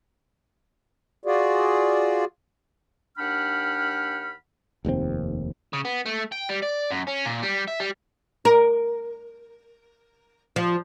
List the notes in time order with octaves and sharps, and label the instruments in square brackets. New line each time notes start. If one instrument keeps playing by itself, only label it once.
[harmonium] F4 F#4 G#4 D5
[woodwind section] D#2 D4 F#5 G5 B5 F6
[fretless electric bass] F1 D#2 B2 C4
[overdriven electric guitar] C#3
B3
A3
G5
G3
D5
F#2
C#4
A#2
G3
E5
G3
[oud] A#4
F3